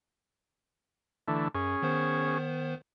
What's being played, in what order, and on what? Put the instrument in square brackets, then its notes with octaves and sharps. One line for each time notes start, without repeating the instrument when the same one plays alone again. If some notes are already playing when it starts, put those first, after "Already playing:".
[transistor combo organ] D3 E3 A3
[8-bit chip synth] F#2 [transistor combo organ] C#4 G#4
[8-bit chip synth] D#3 B3 C5